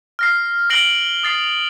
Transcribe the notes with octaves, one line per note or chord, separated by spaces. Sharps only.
F6 A#6 C7
F6 A#6 C7 D7 F#7 G7
D#6 A6 C7